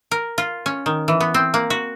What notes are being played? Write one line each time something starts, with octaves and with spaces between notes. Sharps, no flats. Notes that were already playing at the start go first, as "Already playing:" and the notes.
A#4
F4
C#4
D#3
E3
B3
C4
A#3
F#4